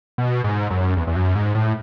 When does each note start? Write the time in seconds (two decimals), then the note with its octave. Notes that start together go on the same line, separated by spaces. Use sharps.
0.18 B2
0.44 G#2
0.70 F#2
0.97 E2
1.07 E2
1.16 F#2
1.35 G#2
1.55 A2